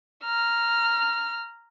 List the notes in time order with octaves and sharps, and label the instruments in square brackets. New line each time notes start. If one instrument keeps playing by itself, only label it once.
[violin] A#5 F6